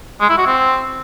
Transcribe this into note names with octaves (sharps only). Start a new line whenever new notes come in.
G#3
E4
F#4
C4